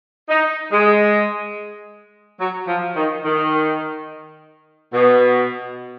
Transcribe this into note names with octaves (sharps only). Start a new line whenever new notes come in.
D#4
G#3
F#3
F3
D#3
D#3
B2